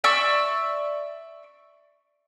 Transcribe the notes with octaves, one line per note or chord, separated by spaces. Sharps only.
D5 E5 C#6 E6